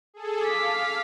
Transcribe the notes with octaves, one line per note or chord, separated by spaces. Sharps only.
G#4 A4
F5 D6 B6